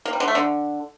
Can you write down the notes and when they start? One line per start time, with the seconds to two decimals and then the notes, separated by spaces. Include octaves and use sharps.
0.05 A#3
0.13 G3
0.20 D3
0.28 A3
0.35 D3